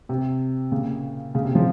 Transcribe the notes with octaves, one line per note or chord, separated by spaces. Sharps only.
C3
A#2 C#3
A#2 C#3
C3
F3 G#3